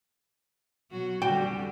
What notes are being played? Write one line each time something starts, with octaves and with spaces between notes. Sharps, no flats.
B2 F#3 F#4
F2 D3 G3 F#4 G5